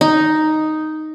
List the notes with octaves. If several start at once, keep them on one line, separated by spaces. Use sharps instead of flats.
D#4